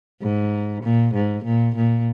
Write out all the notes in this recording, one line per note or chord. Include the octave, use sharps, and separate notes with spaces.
G#2
A#2
G#2
A#2
A#2